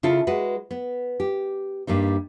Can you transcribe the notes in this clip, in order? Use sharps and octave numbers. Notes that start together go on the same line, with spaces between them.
C#3 E4 F4 A4
G#3 F#4 B4
B3
G4
G2 G3 A#3 D#4